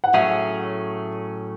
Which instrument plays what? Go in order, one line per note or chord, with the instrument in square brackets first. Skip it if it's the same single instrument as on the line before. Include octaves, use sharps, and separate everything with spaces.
[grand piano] F#5
[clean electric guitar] A2 F#3 A3 C#4 G#4 [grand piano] E5